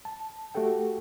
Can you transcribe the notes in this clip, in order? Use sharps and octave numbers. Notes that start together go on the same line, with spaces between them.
A5
A3 F#4 G4 A4 G5